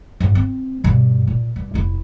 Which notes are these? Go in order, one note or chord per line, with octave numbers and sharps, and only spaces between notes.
A1 G2
C4
G2 B2
A#2
G2
F1 E4